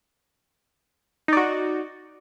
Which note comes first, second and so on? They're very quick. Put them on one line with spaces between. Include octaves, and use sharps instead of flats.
D#4 D5 F#4